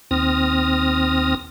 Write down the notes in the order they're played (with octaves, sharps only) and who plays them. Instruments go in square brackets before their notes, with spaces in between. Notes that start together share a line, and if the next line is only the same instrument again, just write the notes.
[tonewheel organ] D#2 C4 D#6 F6 A#6